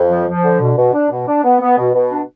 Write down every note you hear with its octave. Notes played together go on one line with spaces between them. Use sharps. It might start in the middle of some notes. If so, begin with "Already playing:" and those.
Already playing: F2
F3
F3
D3
B2
B2
D4
B2
D4
B3
B3
B2
B2
D4